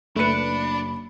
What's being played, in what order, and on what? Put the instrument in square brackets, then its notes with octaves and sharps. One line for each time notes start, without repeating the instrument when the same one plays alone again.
[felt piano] F#1 C#7 [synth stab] A3 B4 [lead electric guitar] D4 [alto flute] B5